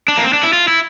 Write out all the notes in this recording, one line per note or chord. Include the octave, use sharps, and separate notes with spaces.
D4
A#3
C4
D4
E4
F4
E4